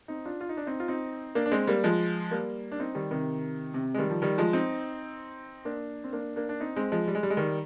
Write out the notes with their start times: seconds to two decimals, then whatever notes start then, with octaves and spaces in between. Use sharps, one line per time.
0.08 C4 D#4
0.25 D4 F4
0.41 F4
0.49 D#4
0.57 D4
0.66 C4 D#4
0.80 F4
0.88 C4 D#4
1.35 A#3 D4
1.46 D4
1.51 G#3 C4
1.67 G3 A#3
1.84 F3 G#3
2.31 G3 A#3
2.72 D4
2.80 C4 D#4
2.95 D#3 G3
3.11 C3 D#3
3.74 C3
3.94 G#3
3.98 D#3 G3
4.10 F3
4.22 D#3 G3
4.38 F3 G#3
4.53 C4 D#4
5.65 A#3 D4
6.04 C4
6.13 A#3 D4
6.36 A#3 D4
6.49 D4
6.60 C4 D#4
6.76 G#3 C4
6.92 F3 G#3
7.08 G3
7.15 G#3
7.23 G3
7.30 G#3
7.37 D#3 G3